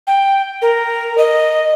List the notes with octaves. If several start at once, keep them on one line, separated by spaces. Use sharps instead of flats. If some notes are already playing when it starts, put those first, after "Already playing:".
G5
A#4
D#5